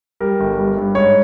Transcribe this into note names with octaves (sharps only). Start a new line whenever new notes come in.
G3 A#4
G1
G3
G2
G#2 C#5